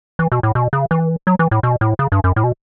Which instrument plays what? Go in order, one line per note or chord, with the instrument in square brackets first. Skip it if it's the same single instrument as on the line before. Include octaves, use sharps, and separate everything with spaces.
[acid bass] E3
B2
A2
B2
C#3
E3
F#3
E3
A2
B2
A2
C#3
G2
F#2
A2
B2